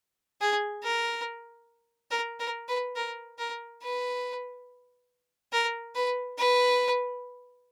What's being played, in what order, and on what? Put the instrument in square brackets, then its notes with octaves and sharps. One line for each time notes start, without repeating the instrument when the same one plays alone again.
[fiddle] G#4
A#4
A#4
A#4
B4
A#4
A#4
B4
A#4
B4
B4